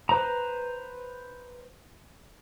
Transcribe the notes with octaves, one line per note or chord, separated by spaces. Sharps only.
B4 C5 A#5